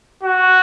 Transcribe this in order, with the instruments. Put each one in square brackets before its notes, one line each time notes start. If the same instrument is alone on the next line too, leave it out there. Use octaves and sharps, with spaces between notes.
[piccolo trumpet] F#4